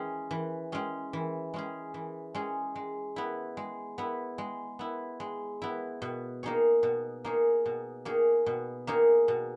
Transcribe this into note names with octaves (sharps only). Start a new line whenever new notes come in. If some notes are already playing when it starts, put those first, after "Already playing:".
Already playing: E3 G#3 C#4 G#4
E3
G#3 C#4 G#4
E3
G#3 C#4 G#4
E3
G#3 C#4 G#4
G#3
B3 E4
G#3
B3 E4
G#3
B3 E4
G#3
B3 E4
B2
A#3 D#4 G#4 C#5
B2
A#3 D#4 G#4 C#5
B2
A#3 D#4 G#4 C#5
B2
A#3 D#4 G#4 C#5
B2